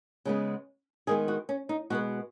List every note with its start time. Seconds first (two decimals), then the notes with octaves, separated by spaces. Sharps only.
0.25 C#3 G#3 B3
1.07 D#3 G#3 B3 G#4
1.28 F#4
1.49 C#4
1.69 D#4
1.90 B2 G#3 B3 F#4